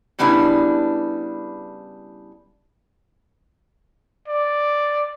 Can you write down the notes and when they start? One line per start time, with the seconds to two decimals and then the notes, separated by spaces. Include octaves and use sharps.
0.19 C#3 G3 B3 D4 E4 B4
4.28 D5